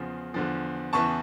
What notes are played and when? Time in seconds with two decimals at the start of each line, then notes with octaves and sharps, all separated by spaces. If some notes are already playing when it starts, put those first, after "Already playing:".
Already playing: E2 C#3 F3
0.34 E2 D3 F3
0.93 E2 C#3 E3 A5 C#6